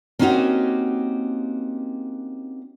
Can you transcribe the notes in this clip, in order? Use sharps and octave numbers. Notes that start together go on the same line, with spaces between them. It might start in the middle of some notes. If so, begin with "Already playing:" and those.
A#3 C4 C#4 D#4 F#4 G4